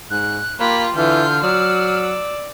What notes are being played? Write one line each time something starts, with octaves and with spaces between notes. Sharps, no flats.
G#2 F#6
A#3 F4 G4 B5
D3 E3 F4 F6 G6
F#3 D5 E6